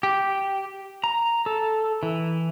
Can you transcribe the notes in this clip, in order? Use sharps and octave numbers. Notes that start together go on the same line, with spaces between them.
G4
A#5
A4
E3